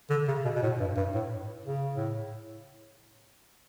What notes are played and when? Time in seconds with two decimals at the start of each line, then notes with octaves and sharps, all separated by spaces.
0.10 D3
0.28 C#3
0.45 B2
0.55 B2
0.62 A2
0.80 G2
0.97 G2
1.14 A2
1.65 C#3
1.95 A2